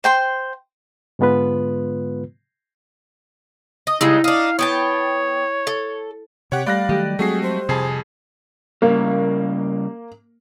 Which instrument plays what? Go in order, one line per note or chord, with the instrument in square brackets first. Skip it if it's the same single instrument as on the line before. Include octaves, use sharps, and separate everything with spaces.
[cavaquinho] C5 G5 C6
[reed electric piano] G#2 D3 G#3 B3 F4 B4
[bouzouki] D#5
[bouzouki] C#3 G3 G#3 [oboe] D#4 [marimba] E4
[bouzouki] D4 D#4 [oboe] F5
[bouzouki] B3 G5 A5 [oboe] C#5
[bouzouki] A4
[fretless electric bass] C3 [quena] G4 [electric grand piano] C#5 F#5
[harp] G3 B5 G6 [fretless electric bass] A3 [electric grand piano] D5 F#6 A#6 [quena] F5
[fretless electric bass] D#3 F#3 A3 [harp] G4 D#5
[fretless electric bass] F#3 G#3 C4 [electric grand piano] A3 F#4 C7 [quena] G#4
[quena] C5
[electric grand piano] F2 G#4 C7 [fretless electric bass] C3 [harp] G#5 A5
[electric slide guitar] C#3 G3 [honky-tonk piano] A#3